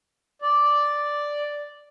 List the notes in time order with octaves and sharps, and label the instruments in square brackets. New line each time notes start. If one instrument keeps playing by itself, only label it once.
[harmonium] D5